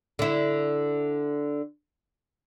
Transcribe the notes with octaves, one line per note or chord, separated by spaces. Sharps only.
D3 E4